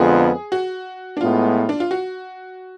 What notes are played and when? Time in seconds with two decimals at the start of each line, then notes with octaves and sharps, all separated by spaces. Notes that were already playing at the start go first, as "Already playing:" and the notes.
Already playing: F2 D3 G#3 B3 F4 G#4
0.52 F#4
1.17 D4
1.21 A2 G#3 B3 F4
1.69 D4
1.80 F4
1.91 F#4